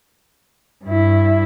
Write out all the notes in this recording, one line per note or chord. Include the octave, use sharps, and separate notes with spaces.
G2 E4